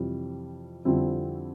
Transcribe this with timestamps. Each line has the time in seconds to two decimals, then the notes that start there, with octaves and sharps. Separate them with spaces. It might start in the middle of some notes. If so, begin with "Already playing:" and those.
Already playing: F2 C3 E3 G3
0.85 F2 D3 G3 C4 E4